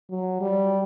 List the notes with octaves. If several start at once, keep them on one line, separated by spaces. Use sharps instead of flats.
F#3
G3